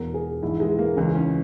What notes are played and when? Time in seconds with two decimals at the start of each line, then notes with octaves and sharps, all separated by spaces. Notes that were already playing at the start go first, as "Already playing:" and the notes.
Already playing: E1 E2 B2 A#4
0.14 G#4
0.42 A#1 G#2 E3 E4
0.60 G#3
0.79 A#3
0.97 C#2 C#3 E3 C#4
1.15 C#4